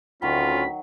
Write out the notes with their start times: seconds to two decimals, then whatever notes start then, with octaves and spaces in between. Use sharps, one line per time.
0.22 D2 D#3 F#3 C#4 F4 B5